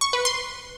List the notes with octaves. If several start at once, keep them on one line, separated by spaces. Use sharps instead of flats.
C#6
B4
C6